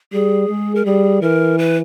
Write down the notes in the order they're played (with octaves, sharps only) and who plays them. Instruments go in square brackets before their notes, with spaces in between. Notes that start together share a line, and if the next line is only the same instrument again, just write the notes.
[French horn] G3 [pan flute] G#4
[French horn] G#3
[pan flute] A#4
[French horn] G3 [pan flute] G#4
[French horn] E3 [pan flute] A#4
[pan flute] B4